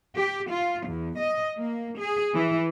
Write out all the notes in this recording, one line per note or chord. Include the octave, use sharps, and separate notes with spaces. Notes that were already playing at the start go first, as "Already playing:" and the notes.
G4
F4
E2
D#5
A#3
G#4
E3